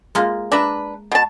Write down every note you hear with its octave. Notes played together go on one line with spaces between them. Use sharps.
G#3 A#3 F4
D4 B4 E5 A#5
B2 A5